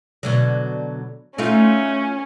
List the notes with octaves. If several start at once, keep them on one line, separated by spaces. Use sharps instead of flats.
B2 D3 F#3
A3 C#4 D#4 F4